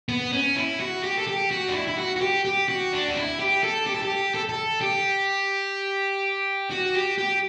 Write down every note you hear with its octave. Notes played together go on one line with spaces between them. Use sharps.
B3
C#4
E4
F#4
G4
A4
G4
F#4
D4
E4
E4
F#4
F#4
G4
G4
F#4
D4
F#4
E4
G4
A4
G4
A4
G4
A4
A4
G4
F#4
G4
G4